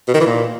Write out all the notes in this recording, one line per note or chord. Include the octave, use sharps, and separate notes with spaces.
B2
D#3
E3
A#2